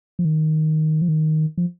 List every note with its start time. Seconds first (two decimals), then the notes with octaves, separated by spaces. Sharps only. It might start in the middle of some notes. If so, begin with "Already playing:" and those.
0.19 F3
0.25 D#3
1.02 F3
1.08 D#3
1.58 F3